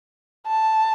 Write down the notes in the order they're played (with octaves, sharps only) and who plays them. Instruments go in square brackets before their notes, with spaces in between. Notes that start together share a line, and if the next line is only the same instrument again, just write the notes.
[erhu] A5